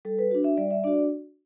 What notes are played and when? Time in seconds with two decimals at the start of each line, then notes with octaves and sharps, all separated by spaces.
0.05 G3 A4
0.19 B4
0.31 D4 F#4
0.44 E5
0.57 G3 D5
0.71 E5
0.84 D4 F#4 D5